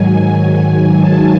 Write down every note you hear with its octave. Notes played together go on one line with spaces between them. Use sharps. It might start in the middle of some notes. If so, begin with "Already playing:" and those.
Already playing: G#2 D#3 F#3 G#5
A5